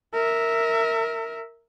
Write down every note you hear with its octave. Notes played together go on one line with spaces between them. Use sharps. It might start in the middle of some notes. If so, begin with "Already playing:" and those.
A#4 E5